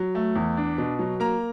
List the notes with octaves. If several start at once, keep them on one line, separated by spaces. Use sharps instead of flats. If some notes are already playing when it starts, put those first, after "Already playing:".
Already playing: F#3
A3
E2
D4
B2
F#3
A#3 A#5